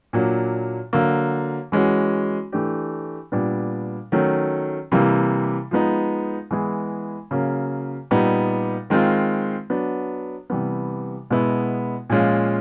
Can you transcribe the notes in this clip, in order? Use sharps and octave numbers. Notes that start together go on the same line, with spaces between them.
A#2 F#3 A#3 D4
D3 F#3 A#3
E3 G#3 C#4 F#4
E3 A3 D4 G4
A#2 G3 B3 D4
D#3 F#3 A3 C#4
C3 E3 G3 A#3
F3 G#3 B3 D#4
E3 G#3 B3 E4 G#4
C#3 F#3 A#3
A#2 G3 B3 D#4
D#3 G#3 C4 F4
F#3 B3 D4
C3 E3 G3 B3
B2 G#3 B3 E4
A#2 F3 G#3 C#4 F4